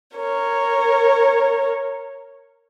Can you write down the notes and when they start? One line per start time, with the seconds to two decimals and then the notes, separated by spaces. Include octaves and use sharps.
0.16 A#4 C#5